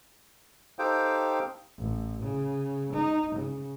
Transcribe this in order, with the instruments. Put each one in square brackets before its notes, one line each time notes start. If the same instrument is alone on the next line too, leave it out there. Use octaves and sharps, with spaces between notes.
[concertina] D#4 G4 A4 C5 F5 G5
[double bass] A1
C#3
D#4
C#3